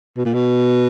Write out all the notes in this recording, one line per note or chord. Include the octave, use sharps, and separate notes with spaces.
B2
A#2
B2